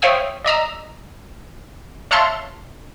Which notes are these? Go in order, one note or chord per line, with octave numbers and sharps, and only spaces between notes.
C5 C#5 E5 F5 G5 D#6
D5 D#5 A#5 E6
C#5 E5 F5 A5 C6